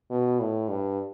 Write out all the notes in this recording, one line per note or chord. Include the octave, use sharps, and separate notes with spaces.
B2
A2
G2